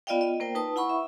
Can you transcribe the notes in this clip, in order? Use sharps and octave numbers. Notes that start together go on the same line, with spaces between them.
B3 F4 D5 D#5 F5 G5
D#5
A#3 A#4 C5 G5
D#4 B4 A5 D#6
E4 F#5 B5 C#6 E6
E5